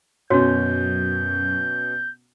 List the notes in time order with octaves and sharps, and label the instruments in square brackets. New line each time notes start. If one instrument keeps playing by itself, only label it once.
[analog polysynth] F#2 [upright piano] B2 C#4 [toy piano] F#4 C#5 [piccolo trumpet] G6